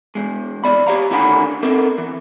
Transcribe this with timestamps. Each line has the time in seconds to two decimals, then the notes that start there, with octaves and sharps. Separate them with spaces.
0.15 E2 G#3
0.64 E3 F#3 D5 B5
0.87 G4 C#5 F5 A#5
1.11 A2 D3 D#3 C#4 F#5 B5
1.63 B3 C4 A4 A#4
1.98 E3